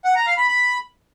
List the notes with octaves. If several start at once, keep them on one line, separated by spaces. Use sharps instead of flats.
F#5
A#5
F5
B5
B5